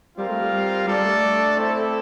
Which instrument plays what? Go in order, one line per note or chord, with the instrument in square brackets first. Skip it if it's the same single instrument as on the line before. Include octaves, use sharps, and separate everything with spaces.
[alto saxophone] G3 [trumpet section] C4 F4 A#4 F5
[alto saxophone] A3
G3
[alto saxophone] G3 [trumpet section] D4 A4 D5
[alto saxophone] A3
[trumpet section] C4 E4 A4 E5